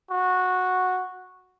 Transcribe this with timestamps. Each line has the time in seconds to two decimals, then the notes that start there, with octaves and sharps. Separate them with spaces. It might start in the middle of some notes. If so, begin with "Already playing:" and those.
0.11 F#4